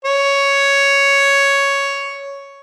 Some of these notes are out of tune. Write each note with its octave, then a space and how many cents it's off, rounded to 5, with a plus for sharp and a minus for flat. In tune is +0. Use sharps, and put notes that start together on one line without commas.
C#5 +5